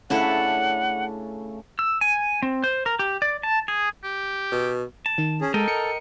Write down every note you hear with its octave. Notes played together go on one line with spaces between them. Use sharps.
C#3 A3 C#4 D4 E4 A4 F#5
E6
G#5
C4
C5
A#4
G4
D5
A5
G#4
G4
B2
A5
D#3
C#4 G#4
G#3 A4 A#4 D#5 G5
C#7